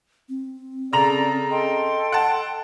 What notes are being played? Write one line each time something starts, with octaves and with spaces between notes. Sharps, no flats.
C4
C#3 A4 D5 A#5 F7
A4 D#5 G5 C6
F#5 A5